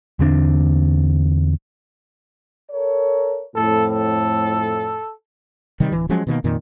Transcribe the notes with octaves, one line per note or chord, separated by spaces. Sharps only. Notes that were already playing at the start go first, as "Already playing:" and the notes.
E2 D3 C4 D4
A4 A#4 C#5
F2 A2 A4
A4
C3 D#3 G3
D1 E3
F3 F#3 G#3 C#4
B2 D#3 E3 A#3
F2 A#2 D#3